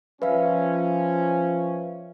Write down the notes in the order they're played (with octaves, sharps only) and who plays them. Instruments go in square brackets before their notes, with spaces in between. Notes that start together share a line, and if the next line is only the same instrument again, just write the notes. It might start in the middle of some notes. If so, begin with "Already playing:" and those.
[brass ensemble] F3 C#4 [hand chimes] B4 E5 F5